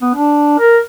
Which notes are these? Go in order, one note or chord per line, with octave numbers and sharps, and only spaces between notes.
B3
D4
A#4